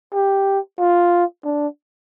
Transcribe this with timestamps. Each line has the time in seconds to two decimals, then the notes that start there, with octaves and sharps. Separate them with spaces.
0.14 G4
0.79 F4
1.44 D4